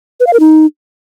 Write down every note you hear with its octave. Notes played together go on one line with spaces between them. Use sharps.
B4
F5
A#4
D#4